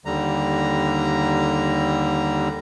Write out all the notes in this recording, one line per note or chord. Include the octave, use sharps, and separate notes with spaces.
D#2 D3 G3 A#5